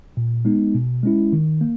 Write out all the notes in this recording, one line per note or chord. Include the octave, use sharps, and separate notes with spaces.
A#2
G#3 B3 D#4
B2
G#3 C#4 E4
D#3
A#3